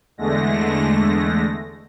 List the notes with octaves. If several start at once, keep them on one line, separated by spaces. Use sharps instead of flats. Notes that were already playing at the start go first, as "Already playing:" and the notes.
E2 D3 G#3 A3 A#6